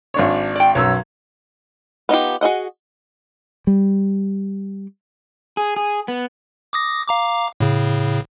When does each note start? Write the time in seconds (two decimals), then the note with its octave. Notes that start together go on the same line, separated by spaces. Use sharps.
0.14 G#1 D4 C#5
0.56 D5 G5
0.75 B1 F#2 C#5 E6
2.09 B3 D#4 F4 G4
2.41 F#4 G#4 D#5 F#5
3.67 G3
5.57 G#4
5.76 G#4
6.08 B3
6.73 D6 D#6 A#6
7.08 F5 A#5 D6
7.60 A2 C#3